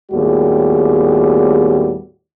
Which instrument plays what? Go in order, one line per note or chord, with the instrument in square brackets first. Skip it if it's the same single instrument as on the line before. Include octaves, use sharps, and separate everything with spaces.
[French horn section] D#2 A2 G3 B3 F#4 G#4